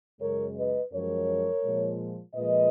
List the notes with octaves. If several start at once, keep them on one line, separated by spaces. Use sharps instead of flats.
F#2 C#3 G#3 A#4 C#5
B4 D#5
F#2 F3 G#3 A#4 C#5
A#2 F3 G#3
A#2 F3 G#3 B4 D#5